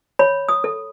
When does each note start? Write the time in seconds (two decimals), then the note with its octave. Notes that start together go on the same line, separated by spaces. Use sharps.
0.19 C#5 B5
0.49 D#6
0.64 A4